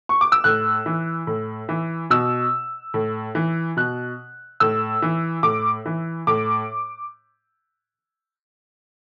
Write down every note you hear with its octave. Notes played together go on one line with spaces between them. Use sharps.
C#6
D6
E6
A2 F#6
E3
A2
E3
B2 E6
A2
E3
B2 F#6
A2 E6
E3
A2 D6
E3
A2 D6